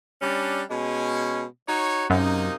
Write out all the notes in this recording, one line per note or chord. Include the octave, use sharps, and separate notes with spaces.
G3 C#4 D4
B2 G#3 C#4
D#4 F#4 C#5
F#2 C3 A#3 D#4